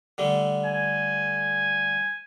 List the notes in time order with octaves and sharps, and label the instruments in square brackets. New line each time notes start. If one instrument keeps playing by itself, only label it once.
[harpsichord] D3 G3 A3
[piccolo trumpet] G#5